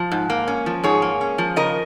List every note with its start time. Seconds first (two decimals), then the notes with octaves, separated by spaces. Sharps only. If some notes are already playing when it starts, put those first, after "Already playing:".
Already playing: F3
0.12 G#2
0.30 A#3
0.48 C#4
0.66 F3
0.84 G#2 G#4 C#5
1.02 A#3
1.21 C#4
1.38 F3
1.56 C#3 A#4 D#5